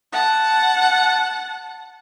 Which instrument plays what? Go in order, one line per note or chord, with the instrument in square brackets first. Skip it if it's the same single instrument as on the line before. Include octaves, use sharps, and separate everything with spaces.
[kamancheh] F#5 A5